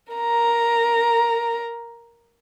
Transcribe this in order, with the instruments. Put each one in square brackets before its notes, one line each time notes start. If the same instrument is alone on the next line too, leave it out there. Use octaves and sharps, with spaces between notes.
[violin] A#4 A#5